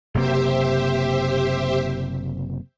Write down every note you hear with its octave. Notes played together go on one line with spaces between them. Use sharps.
F#1 C3 A#3 G4 C5 E5